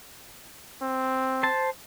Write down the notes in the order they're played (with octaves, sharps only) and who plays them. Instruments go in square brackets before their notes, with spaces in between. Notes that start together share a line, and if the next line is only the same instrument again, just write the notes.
[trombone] C4
[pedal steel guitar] C5 A5